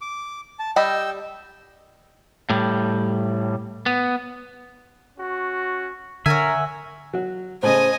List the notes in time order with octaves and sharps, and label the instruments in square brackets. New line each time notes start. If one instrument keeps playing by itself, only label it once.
[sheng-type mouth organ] D6
A5
[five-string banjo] G3 D#5 B5 [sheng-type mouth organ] G5 E6
[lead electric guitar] A2 G3
B3
[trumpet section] C#4 F#4
[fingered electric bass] D3 [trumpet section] A#4 [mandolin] C#5 F#5 G#5 [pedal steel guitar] E5
[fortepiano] F#3 F#4
[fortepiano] A2 C#3 [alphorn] C5 [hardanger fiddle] D#5 G#5